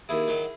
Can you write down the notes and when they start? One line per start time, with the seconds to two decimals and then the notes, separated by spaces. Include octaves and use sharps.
0.09 D#2 E4 G#4
0.28 D#3 F#3